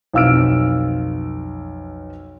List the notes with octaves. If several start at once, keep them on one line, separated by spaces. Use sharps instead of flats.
B1 F2 F5 E6 F6 D7